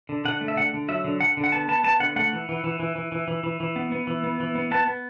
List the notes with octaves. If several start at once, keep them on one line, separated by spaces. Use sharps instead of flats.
D3
D3 F#5
A3
E5
D3 F#5
D3
F#3 E5
D3
D3 F#5
D3
F#5
B3 A5
B3 A5
B3 A5
D3 F#5
A3 F#5
E3
E3
E3
E3
E3
E3
E3
E3
E3
B3
B3
E3
B3
E3
B3
B3 A5
B3